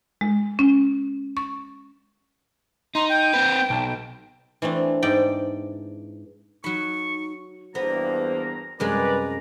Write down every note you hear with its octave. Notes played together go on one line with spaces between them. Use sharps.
G#3
C#4
C#6
D#4 A#5 C6
G5 G6
C4 B4
B1 A5
E3 A3 C4 D4
G#2 D5 G5
F#3 D#4 B5 C#6
E2 G2 A#3 B3 C5 A#5
F#2 C3 G3 G#3 A#4 B4 D5 A#5